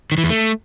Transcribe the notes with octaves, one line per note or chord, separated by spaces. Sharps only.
D#3
E3
E2
A3